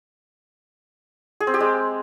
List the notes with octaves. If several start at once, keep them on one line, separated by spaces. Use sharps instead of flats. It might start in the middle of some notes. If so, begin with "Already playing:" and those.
G#4
C4
G4
G#3